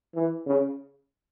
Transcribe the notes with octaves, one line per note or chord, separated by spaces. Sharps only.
E3
C#3